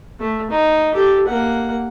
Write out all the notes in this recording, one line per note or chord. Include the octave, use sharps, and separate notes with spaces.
A3
D#4
G4 A4
A#3 F#5